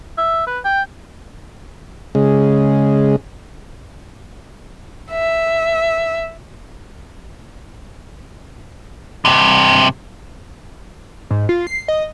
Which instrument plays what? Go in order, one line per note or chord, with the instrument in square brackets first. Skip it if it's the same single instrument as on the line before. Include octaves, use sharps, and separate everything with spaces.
[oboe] E5
B4
G5
[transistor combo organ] C#3 G#3
[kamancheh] E5
[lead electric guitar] G2 C3
[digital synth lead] G#2
F4
C7
D#5